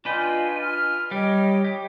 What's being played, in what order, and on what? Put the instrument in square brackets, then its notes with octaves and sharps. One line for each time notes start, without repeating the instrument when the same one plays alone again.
[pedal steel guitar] D4 B4 G5 [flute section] F4 D#5 G#5
[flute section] F6
[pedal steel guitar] G3 G4 [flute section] C#5 D#5 G5
[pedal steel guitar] G4